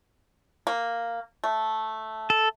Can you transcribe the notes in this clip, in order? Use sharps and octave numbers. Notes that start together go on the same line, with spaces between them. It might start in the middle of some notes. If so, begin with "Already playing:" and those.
A#3
A3
A4